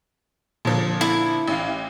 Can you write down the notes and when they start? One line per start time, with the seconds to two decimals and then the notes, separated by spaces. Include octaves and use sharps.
0.65 A#2 D3 F3
1.01 E4
1.48 A1 E3 F5